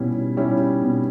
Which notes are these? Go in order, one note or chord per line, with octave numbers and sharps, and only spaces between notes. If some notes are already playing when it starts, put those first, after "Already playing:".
Already playing: B2 G3 C#4 E4
G3 C#4 E4
B2